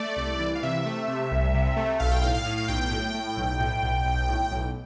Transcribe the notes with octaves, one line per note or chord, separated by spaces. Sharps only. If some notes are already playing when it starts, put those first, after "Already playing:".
Already playing: A3 D5
C2
E3
F5
C3 E5
A3
C3
C2
C3
A3
B1 F5
G5
A2 F5
F5
A2
F5
B1 G5
A2
A2
B1
A2
B1
B1
A2
B1